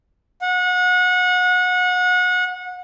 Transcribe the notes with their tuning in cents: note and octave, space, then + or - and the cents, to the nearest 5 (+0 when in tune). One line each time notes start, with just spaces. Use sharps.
F#5 -30